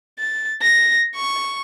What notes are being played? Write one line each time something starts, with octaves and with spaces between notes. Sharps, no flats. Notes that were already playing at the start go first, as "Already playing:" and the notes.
A6
A#6
C#6